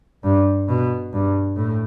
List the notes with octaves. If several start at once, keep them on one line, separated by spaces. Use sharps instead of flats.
G2
B2
G2
A2